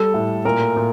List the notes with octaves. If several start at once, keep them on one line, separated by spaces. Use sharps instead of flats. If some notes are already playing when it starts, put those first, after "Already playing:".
Already playing: G3 A4
A2
A#2 A#4
A#2